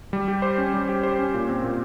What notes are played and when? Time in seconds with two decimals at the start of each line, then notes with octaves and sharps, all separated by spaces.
0.13 G3
0.28 G4
0.42 C5
0.58 C#4
0.74 G3
0.89 G4
1.03 C5
1.19 C#4
1.34 A#2
1.49 C4
1.64 A#2